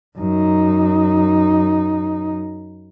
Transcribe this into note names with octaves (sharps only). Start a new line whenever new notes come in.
F#2 D#4